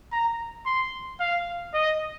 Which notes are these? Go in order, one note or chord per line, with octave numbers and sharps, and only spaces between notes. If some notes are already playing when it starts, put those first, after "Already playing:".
A#5
C6
F5
D#5